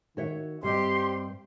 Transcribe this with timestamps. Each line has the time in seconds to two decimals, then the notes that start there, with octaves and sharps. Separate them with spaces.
0.17 D#3 F#4 C#5 E5
0.63 G2 G3 C4 G4 D#5 C6